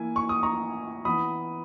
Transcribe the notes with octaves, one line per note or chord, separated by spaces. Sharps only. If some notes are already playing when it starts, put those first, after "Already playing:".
Already playing: E3 A#3 E4 G#5
C#6
D#6
A#5 C#6
E3 B3 E4 B5 D#6